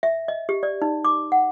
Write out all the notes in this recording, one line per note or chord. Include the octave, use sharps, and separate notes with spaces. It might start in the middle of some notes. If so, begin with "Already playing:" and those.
E5
D#5
G4
D5
D#4
D6
F#5